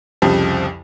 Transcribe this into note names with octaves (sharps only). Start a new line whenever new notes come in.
C2 F2 C#3 F3 G3